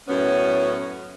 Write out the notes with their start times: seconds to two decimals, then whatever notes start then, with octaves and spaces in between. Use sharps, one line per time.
0.08 F#2 A2 B3 C#4